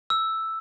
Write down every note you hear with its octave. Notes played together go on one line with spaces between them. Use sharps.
E6